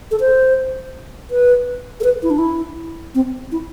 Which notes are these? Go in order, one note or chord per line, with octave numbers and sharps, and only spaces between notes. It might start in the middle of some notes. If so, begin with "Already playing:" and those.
A4
C5
B4
A4
B4
E4
D4
E4
C4
E4